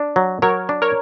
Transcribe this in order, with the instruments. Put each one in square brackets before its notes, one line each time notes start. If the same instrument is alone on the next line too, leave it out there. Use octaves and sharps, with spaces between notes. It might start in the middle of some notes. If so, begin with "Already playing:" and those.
Already playing: [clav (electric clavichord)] D4
F#3
[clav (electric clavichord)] F#3 [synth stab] A#4 C#5
[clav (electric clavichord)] D4
[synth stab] A#4 C#5